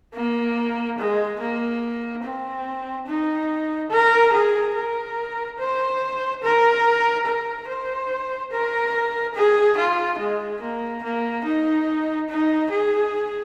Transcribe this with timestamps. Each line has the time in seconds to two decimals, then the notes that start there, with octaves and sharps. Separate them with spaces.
0.14 A#3
0.98 G#3
1.40 A#3
2.23 C4
3.07 D#4
3.90 A#4
4.32 G#4
4.75 A#4
5.59 C5
6.42 A#4
7.26 A#4
7.67 C5
8.51 A#4
9.35 G#4
9.77 F4
10.19 G#3
10.61 A#3
11.03 A#3
11.44 D#4
12.29 D#4
12.70 G#4